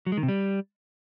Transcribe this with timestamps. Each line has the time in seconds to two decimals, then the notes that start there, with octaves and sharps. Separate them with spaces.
0.07 F#3
0.12 G#3
0.17 D#3
0.23 C3
0.28 G3